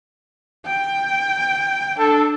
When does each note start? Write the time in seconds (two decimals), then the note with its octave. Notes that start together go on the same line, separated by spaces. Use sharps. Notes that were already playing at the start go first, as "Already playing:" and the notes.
0.66 G5
1.99 D4 A4